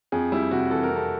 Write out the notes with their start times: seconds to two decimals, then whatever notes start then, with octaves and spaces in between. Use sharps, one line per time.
0.12 F2 G#4
0.32 G3 E4
0.51 C3 F#4
0.70 E3 A4
0.83 A#4
0.90 F2
0.96 A4